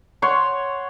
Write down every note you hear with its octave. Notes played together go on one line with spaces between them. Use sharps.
C#5 F#5 C6